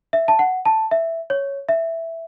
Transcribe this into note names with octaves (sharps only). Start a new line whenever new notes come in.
E5
A5
F#5
A5
E5
C#5
E5